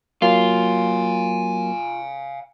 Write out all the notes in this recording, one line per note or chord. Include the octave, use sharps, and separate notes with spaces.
F#3 A#3 F4 F5 G#5